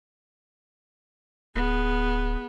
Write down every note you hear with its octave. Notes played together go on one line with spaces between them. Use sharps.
D1 B3 G#4